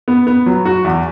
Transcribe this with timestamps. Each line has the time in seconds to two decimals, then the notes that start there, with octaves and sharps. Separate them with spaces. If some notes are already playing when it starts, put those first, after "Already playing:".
0.08 B3
0.27 B3
0.46 F#3
0.65 F#4
0.84 E2